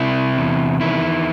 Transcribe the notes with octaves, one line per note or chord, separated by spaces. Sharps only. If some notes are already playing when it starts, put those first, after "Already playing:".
Already playing: C3 E4
E2
D#3 E4